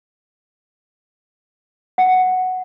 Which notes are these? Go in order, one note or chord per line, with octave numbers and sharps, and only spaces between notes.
F#5